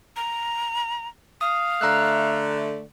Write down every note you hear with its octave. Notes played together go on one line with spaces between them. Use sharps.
A#5
F5 D#6
D3 A3 A#5 E6 F#6